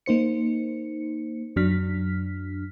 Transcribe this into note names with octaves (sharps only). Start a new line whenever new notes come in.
A#3 D#4 C5 C#7
F#2 F#3 D4 F6 B6